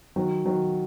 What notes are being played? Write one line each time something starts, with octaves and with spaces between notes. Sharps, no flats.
D#3 F#3
D#3 F#3